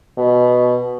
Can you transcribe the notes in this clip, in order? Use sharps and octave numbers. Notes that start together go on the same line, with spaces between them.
B2